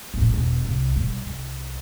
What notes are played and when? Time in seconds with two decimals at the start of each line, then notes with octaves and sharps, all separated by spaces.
0.14 A#1 A#2
0.34 E1 B2
0.65 C2
0.96 B1 G3
1.26 C2